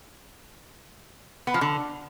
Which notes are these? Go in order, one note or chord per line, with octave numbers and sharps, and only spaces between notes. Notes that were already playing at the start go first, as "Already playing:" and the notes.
B3
F3
D3